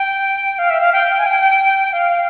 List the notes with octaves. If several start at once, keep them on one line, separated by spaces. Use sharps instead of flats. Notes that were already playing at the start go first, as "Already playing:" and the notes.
Already playing: G5
F5
E5
F5
G5
G#5
G5
F5